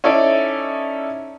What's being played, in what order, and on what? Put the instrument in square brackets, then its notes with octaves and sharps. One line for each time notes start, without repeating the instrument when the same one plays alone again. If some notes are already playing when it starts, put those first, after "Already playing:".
[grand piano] C#4 D#4 E4 A4 D5